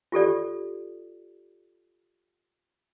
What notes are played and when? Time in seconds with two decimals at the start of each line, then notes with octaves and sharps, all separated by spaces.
0.12 F4 G4 A4 D5